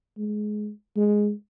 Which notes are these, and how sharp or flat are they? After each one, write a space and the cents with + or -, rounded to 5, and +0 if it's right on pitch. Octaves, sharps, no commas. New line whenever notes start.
G#3 +20
G#3 +0